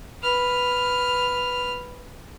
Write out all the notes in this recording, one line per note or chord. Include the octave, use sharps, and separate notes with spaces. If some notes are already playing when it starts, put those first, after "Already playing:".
B4 F6